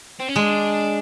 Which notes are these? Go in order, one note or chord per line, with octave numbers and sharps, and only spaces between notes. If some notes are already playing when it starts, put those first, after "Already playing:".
C4
C#4
G#3 D4